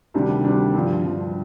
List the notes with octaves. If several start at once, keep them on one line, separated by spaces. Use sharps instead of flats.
D2 C3 D#3 G3 D4
D2 C3 D#3 G3 D4
G2 D3 F3
G2 D3 F3